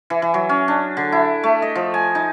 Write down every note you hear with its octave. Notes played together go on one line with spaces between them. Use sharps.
E3
E3
F#3
C#4
D4
D3
E4
A3
D#5
F3
G#5
D#4